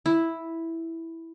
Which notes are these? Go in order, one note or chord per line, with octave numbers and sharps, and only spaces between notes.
E4